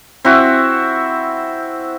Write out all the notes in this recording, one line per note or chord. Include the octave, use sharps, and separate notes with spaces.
C4 E4 F#4